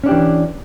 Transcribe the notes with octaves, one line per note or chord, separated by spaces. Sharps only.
E3 C#4 D4 G4